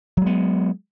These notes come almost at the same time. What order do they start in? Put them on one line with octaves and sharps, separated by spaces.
F#3 G#3 B3